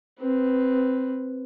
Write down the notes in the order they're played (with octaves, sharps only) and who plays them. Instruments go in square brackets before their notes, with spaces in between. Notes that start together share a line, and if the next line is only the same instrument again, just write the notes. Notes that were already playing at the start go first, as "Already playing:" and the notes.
[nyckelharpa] C4 B4